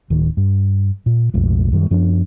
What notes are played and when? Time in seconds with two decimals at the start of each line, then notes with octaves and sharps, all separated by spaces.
0.10 D1 D#3
0.37 G2
1.06 A#2
1.34 B1 F2 A2 G#3
1.72 F#2 D#3 G3
1.91 F#2 F3 B3 D4